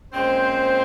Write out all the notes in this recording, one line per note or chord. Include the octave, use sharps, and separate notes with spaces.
A#2 G#3 C4 C#4 C5